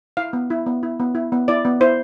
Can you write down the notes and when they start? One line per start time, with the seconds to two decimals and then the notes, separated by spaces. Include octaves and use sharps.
0.17 E4 F5
0.33 B3
0.50 E4
0.66 B3
0.83 E4
1.00 B3
1.15 E4
1.32 B3
1.48 E4 D5
1.65 B3
1.81 E4 C5